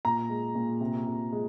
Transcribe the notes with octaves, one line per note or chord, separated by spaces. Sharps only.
A#2 A#5
G#3
A#2
C3
C3
G#3